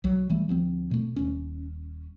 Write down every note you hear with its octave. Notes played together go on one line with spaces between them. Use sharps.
B1 F#3
E3 G3 A3
D2 F3 B3 C4
B2 A3
D#1 C#4